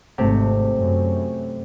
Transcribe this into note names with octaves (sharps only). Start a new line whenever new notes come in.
G#1 C3 A3
F#2